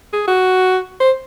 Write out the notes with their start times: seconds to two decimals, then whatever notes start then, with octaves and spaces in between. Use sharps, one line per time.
0.13 G#4
0.27 F#4
1.00 C5